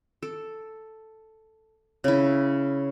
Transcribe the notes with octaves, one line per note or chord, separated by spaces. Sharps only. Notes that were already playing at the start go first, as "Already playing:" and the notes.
A4
C#3 E4